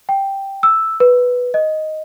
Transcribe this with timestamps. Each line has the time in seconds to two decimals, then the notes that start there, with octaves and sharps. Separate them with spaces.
0.09 G5
0.63 E6
1.00 B4
1.54 D#5